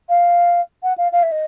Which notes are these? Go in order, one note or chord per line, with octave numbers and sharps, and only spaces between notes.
F5
F#5
F5
F5
E5
D#5